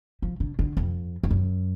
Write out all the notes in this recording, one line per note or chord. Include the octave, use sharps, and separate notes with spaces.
F3
D3
D3
F2
F2
F#2